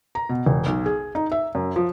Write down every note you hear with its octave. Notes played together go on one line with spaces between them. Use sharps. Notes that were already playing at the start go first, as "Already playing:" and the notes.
A#5
B2
E1
B1
G#4
D#4
E5
F#2
F3